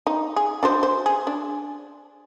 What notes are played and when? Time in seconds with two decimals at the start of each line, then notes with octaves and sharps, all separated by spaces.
0.07 D#4
0.36 G#4
0.63 D4 F#4 C5
0.83 C5
1.06 G#4
1.27 D4